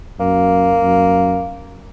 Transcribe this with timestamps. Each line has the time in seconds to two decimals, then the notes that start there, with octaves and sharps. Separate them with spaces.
0.20 F#2 A#3
0.82 F#2